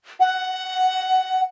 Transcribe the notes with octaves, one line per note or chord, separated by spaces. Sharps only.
F#5